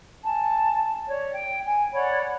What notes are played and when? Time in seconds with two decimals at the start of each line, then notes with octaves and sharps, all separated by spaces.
0.24 G#5 A5
1.08 C#5 D5
1.34 G5
1.63 G#5
1.93 C#5 D5 F#5 B5